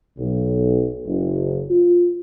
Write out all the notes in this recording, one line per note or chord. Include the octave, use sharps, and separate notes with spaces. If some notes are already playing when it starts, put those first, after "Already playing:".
B1
F#1
F4